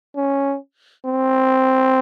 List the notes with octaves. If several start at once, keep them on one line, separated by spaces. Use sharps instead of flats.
C#4
C4